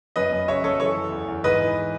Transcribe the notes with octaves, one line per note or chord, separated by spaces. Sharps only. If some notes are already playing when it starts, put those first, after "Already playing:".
F#2 B4 D#5
F#2
C#3 C#5 E5
F#2 A4 C#5
E3 A4 C#5
E3
E2
E2
G#2 B4 D#5
E3